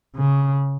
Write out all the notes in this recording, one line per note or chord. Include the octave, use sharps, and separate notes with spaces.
C#3